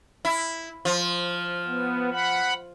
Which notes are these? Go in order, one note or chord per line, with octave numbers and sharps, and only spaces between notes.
E4
F3
B3
F#5 B5